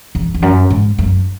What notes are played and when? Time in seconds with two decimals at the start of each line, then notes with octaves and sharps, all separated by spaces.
0.15 E2
0.34 E2
0.42 F#2
0.70 G#2
0.99 F#2